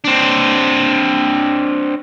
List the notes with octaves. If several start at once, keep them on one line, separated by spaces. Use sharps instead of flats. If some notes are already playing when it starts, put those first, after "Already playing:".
C4 D4